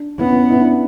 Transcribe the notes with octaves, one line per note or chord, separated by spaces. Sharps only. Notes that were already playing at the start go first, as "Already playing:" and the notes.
Already playing: D4
B3 C#4 E4
E4
D4